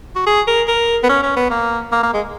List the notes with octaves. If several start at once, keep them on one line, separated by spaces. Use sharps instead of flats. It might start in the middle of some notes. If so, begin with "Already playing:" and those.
F#4
G#4
A#4
A#4
B3
C#4
C#4
B3
A#3
A#3
A#3
G#3